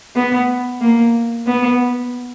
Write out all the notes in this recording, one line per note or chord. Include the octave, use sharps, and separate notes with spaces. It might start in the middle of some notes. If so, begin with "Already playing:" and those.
B3
A#3
B3